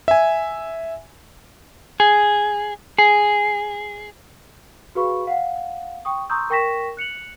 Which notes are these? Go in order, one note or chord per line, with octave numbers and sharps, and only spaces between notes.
E5 G#5
G#4
G#4
F#4 G#4 B4 F5 B5 C#6
F5 F#5
G5 C#6 D#6
A#5 C6 C#6 D#6 E6 G6
A#4 G5 C#6 A#6 B6 E7
F#6 C#7 F7 F#7